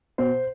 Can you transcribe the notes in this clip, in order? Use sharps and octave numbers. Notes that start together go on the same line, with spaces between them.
B2 C5